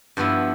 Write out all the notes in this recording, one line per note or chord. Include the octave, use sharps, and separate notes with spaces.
G2 F3 B3 E4